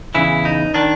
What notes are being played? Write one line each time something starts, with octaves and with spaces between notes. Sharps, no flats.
E2 C#3 E3 E4
D#4
D#3 D4